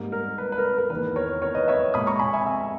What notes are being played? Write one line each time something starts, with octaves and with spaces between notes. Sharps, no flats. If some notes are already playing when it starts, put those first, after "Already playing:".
Already playing: G#2 G3 A#3
A#4
B4
B4
A#4
B4
A#4
E2 D#3 A#3 B4
A#4 C#5
A#4 C#5
B4 D#5
C#5 E5
A#2 G#3 B5 D#6
A#5 C#6
G#5 B5
E5 G#5
E5 G#5